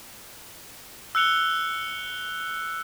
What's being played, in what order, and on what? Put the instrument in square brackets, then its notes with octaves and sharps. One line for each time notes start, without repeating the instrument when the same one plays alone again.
[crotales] E6 F#6 C#7 F7 G7